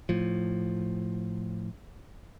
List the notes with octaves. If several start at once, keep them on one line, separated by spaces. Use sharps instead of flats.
A2 F3